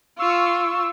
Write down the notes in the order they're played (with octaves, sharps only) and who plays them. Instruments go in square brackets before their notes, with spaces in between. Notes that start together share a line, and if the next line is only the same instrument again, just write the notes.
[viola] F4 [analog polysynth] C#6 E6